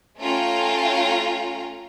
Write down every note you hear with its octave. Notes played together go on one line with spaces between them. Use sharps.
A3 C#4 F4 G5 A#5